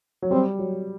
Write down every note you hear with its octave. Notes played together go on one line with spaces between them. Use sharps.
F#3
G3 C4
F#3